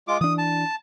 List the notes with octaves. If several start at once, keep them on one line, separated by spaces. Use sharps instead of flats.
G#3 F4 D6
E3 D4 D#6
A5